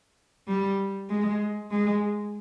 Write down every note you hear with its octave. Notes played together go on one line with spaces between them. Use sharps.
G3
G#3
G#3